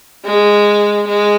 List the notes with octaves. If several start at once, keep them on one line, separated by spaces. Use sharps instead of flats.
G#3
G#3